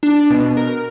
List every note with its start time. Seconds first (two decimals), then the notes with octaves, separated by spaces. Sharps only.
0.03 D4
0.30 B2
0.57 A#4